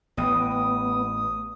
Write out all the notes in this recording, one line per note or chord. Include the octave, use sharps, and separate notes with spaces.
A1 B3 G4 B4 D#6